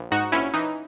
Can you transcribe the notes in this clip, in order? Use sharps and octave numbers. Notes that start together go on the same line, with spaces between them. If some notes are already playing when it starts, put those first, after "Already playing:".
Already playing: A#1
G#2 D#4 F#4
A#1 C#4 E4
E3 D#4